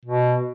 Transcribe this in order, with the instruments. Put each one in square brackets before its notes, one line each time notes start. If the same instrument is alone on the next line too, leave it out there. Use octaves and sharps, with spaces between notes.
[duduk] B2